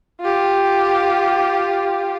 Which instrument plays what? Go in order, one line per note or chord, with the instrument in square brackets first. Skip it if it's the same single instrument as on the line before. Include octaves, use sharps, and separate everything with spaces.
[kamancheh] F4 G4